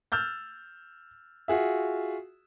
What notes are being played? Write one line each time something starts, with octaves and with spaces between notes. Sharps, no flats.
E6 F6 G6 A6
F4 F#4 G#4 E5